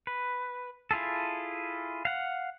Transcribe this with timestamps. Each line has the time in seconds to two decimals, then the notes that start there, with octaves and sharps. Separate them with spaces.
0.07 B4
0.91 E4 F4 G#4 A4
2.05 F5 F#5